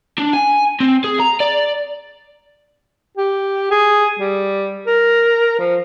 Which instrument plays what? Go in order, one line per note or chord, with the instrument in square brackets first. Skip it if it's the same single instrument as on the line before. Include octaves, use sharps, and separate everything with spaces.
[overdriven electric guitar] D4
G#5
C4
G#4
A#5
D5
[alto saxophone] G4
G#4
G3
A#4
F3